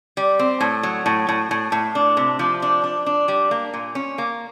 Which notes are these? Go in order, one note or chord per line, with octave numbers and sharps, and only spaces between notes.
G3
C4
A2
F#3
A2
A2
A2
A2
D4
C3
F3
D4
D4
D4
G3
A#3
A#2
C#4
A#3